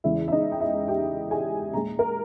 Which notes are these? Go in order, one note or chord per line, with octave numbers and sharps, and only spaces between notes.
E2 C#3 E3 G#3 E4
E5
D#4 D#5
G5
E4 E5
G4 G5
G#4 G#5
A#2 G#3 A#5
A#4 A#5